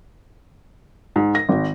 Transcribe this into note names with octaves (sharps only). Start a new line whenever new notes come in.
G#2
A#6
G#1